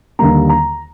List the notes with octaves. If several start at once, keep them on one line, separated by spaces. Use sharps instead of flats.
D#2 D3 G3 A#3 A#5
A#5